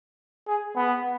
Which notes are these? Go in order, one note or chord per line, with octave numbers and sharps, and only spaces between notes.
G#4
B3